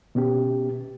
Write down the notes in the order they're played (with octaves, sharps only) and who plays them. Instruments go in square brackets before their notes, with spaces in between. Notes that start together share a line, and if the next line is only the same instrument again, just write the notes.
[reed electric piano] B2 B3 C#4 G4